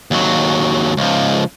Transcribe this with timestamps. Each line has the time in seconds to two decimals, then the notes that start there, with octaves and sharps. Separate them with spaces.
0.11 D#2 F#3
0.97 C#2 F3